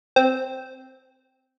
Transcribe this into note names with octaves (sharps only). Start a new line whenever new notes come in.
C4